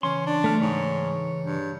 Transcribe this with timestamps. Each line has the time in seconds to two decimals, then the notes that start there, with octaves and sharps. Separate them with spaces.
0.03 C#3 E3 C#4 C6
0.26 D4
0.44 A3 F6
0.62 G#2 C#5
1.43 G2